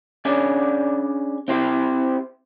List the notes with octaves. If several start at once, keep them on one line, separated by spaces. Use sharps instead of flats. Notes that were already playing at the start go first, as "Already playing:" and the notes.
C#4 D4 G#4 D5
C4 E4 G4 C5